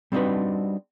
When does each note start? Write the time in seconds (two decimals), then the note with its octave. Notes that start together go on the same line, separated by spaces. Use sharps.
0.12 G3 C4 D4 D#4 F#4 B4